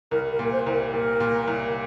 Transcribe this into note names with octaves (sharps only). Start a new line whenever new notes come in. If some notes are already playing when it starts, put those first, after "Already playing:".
C2 A#4
A#4
A#2
A#4
C5
C2
A#4
A#2 A#4
A#2
C2